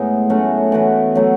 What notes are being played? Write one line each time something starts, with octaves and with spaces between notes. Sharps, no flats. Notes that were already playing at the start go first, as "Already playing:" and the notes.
Already playing: A2 G#3 B3 D#4
F#3 A3 C#4 F#4
E3 B3 F#4 B4
F#3 A3 E4